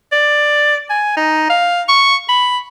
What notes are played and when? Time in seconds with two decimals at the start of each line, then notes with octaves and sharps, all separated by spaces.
0.12 D5
0.90 G#5
1.17 D#4
1.50 F5
1.88 C#6
2.29 B5